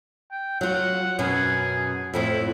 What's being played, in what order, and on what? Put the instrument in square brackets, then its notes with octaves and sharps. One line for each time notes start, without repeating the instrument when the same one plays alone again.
[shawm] G5
[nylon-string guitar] F#3 F4 [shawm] F#5
[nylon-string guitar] F#2 B2 C#4 [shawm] G#4
[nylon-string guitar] F2 A2 F3 [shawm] E4